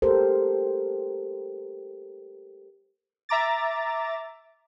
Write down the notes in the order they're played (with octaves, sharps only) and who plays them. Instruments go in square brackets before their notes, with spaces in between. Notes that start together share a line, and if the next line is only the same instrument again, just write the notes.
[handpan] G4 A4 A#4 C5
[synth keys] E5 A#5 D6 A6